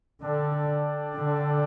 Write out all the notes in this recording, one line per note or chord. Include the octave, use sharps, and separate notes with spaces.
D3 D4 A4 D5 G5
D3